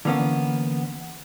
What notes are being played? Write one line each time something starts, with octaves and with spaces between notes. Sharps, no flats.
D3 E3 A#3 B3 C#4